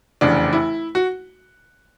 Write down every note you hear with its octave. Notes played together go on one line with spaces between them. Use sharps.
F1 E2 C#3 D4
E4
F#4